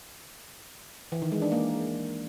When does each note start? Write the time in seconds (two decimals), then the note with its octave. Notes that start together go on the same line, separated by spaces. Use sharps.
1.12 E3
1.22 D#3
1.32 G#3
1.42 D4
1.52 A#3